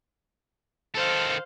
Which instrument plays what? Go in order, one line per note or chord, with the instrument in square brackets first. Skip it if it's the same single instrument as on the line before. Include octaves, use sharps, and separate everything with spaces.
[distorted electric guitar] D#3 A4 [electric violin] C5 F5